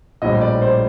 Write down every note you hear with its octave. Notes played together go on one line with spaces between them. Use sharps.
A#1 A2 G3 D#5
D5
C5